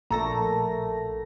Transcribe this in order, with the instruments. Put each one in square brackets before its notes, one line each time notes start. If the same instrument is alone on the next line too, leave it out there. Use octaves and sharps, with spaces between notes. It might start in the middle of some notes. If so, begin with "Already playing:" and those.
[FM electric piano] A#1 A4 A#6 [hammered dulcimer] D3 A3 A#4 [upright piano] A#5